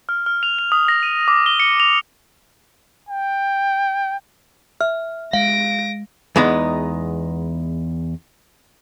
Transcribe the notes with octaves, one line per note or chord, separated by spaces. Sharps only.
F6
F6
F7
F7
D#6
A#6
D#7
D6
G7
C#7
F7
G5
E5 F6
G#3 F5 A#6 D7
E2 G#3 B3 D#4